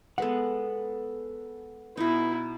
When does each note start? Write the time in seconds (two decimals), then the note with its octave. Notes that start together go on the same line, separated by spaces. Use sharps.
0.18 G#3 B3 A4 B4 F#5
1.97 B2 D#4 E4